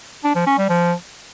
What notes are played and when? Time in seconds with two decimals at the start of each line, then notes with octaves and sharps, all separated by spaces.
0.24 D4
0.35 F3
0.47 C#4
0.58 G3
0.69 F3